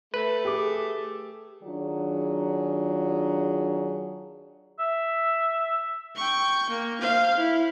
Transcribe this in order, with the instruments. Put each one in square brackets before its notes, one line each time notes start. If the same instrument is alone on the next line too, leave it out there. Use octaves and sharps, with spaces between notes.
[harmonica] A3 [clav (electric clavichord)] B4
[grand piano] G4 G#4 D6
[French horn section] D#3 F#3 D4 F4 G#4
[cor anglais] E5
[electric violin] G5 C#6
A#3
C5 F5
E4